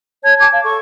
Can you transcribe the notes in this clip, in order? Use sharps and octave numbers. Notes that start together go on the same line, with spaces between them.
C#5 A5 G#6
G#5 A5 D6 G#6
F5
A4 C#6